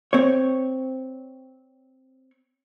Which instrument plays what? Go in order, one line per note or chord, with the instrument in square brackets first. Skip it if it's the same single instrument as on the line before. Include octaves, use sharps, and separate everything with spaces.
[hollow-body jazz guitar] C4 C#5